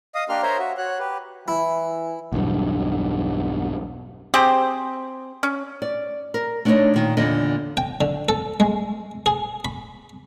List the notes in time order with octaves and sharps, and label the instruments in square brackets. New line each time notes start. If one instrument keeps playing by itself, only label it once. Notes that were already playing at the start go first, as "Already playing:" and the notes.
[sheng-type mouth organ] D#5 F5 D#6
A#3 D4 G4 A#4 C6 F6
A#4 C5 C#5 E5 A#5 C6
F#4 E5
F#4 C#5 F#6
G4 B4
[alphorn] E3 [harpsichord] E4
[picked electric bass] B1 E2 G2
[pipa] C4 G4 G#4 C5
C#4
[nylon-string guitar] D5
A#4
A3 D4 D#4 C5 C#5 D#5
A#2 D#3
E2 A#2 D3 D#5
[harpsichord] G5
D3
A4
G#3
G#4
B5